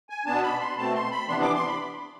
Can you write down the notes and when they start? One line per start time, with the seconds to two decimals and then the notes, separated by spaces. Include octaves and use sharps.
0.10 G#5
0.26 B2 B3 D4 A5
0.43 B5
0.60 C6
0.77 B2 A3 C4 A5
0.94 C6
1.11 B5
1.28 C3 E3 B3 D4 C6
1.42 D6
1.55 C6
1.67 B5